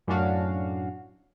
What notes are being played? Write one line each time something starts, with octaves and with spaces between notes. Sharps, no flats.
F#2 A2 C#4 D4 F#4 F5